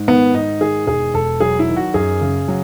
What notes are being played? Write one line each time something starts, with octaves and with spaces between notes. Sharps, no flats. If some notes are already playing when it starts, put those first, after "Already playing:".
Already playing: G#2
D#3 B3
G#2 D#4
D#3 G#4
E1 G#4
E1 A4
F#3 G#4
E4
D#3
F#4
F#2 G#4
C#3
F#3